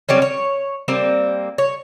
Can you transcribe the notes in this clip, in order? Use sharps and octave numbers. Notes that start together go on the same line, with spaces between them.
F#3 G3 C4 C#4
C#5
G3 A#3 C4
C#5